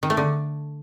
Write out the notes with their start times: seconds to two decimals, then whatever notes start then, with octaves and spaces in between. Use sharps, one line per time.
0.03 D#3
0.10 A3
0.17 D3